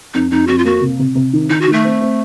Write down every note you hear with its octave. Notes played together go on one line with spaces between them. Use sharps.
F2 D#4
F2 D#4
F2 F#4
F4
A#3 F#4
C3
C3
C3
D#3
D#3 D#4
F#4
D#3
A3
C4
C4